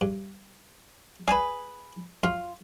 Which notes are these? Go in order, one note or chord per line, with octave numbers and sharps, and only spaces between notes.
G2
G#4 B4 D5 G#5 A5
F#2 F4